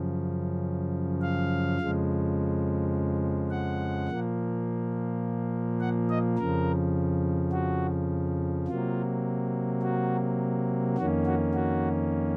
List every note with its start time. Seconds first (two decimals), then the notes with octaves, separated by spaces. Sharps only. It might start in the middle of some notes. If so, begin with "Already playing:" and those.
Already playing: F#2 C#3 F3
1.22 F5
1.79 F2 C#3 F3 G#3
3.51 F#5
4.08 A#2 F3 A#3
5.81 F#5
6.10 D#5
6.38 F2 C#3 F3 A#4
7.52 F#4
8.67 C3 F#3 A#3 F4
9.82 F#4
10.98 F2 D#3 A#3 C#4 F#4
11.26 F#4
11.54 F#4